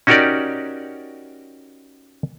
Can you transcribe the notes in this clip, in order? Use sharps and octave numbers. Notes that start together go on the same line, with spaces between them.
C#4 D#4 F#4 G4 A#4 D5